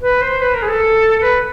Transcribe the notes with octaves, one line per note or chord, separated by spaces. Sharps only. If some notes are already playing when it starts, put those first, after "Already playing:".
B4
C5
B4
A#4
G#4
A4
B4